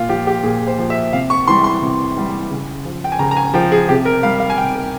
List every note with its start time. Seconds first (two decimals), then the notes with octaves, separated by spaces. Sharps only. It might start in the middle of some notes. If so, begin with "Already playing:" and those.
Already playing: A#2 F4
0.09 F3 G4
0.27 G4
0.43 A#2 G#4
0.67 C5
0.78 F3
0.90 E5
1.13 C3 F5
1.30 C#6
1.48 E3 G3 C6
1.64 C6
1.82 C3
2.16 E3 G3
2.50 C#3
2.85 F3
3.04 G5
3.12 G#5
3.19 C#3 A#5
3.31 A#5
3.37 G#5
3.54 F3 G5
3.72 G#4
3.89 C3 G4
4.05 A#4
4.23 G3 F5
4.40 F5
4.50 G#5
4.58 C3 G5
4.75 A#4